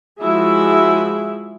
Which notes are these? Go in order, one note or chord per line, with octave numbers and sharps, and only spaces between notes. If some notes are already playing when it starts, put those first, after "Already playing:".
F3 G#3 E4 F#4 G#4 E5